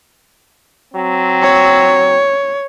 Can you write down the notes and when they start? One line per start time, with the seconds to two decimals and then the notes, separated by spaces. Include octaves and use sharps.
0.94 F#3 C4
1.42 C#5